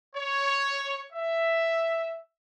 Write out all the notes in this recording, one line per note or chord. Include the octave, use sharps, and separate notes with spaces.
C#5
E5